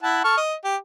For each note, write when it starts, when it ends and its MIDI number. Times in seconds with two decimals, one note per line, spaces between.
0.03 0.24 64
0.03 0.24 78
0.03 0.24 81
0.24 0.37 69
0.24 0.37 85
0.24 0.37 89
0.37 0.54 75
0.64 0.76 67